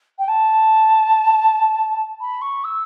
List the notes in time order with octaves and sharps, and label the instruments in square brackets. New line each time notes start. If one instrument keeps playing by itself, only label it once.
[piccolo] G5
A5
B5
C#6
E6